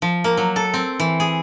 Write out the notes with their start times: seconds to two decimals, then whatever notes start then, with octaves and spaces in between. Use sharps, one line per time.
0.02 F3
0.24 A#3
0.37 F#3
0.56 A4
0.74 C4
1.00 E3
1.20 G#4